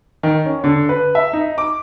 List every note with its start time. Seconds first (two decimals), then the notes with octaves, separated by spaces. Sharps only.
0.23 D#3
0.46 C#4
0.64 D3
0.89 B4
1.15 E5
1.33 D#4
1.58 D6